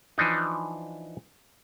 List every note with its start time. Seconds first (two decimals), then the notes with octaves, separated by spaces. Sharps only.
0.18 E3 F3 D4 D#4